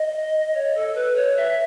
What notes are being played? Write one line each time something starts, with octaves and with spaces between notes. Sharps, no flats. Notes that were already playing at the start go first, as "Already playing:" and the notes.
Already playing: D#5
C#5
A4
B4
C#5
E5